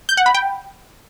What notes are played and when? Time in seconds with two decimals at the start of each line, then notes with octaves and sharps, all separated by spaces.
0.09 G6
0.17 F#5
0.26 B5
0.35 G5